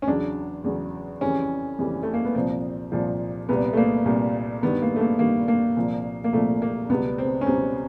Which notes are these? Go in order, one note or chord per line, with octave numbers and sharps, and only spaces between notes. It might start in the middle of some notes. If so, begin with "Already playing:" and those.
C#4
E2 C#3 F#3 D4
E2 C#3 F#3
F2 C#3 E3 G3 C#4
F2 C#3 E3 G3
A3
A#3
B3
C2 A#2 F3 C4
C2 A#2 F3
C2 A#2 G3 B3
A3
A#3
C2 A#2 G3
G2 D#3 G3 B3
A#3
A3
A#3
G2 D#3 G3 A#3
A#3
C2 A#2 F3
A#3
C2 A#2 F3 A3
A#3
C#2 B2 G3 B3
C4
C#4
C#2 B2 G3 C4